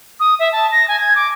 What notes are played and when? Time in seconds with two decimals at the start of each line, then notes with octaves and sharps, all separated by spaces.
0.20 D#6
0.39 E5
0.52 A5
0.72 A#6
0.88 G#5
1.01 G#6
1.16 D6